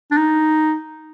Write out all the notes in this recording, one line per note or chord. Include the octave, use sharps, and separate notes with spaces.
D4
D#4